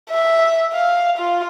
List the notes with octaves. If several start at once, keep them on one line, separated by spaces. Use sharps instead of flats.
E5
F5
F4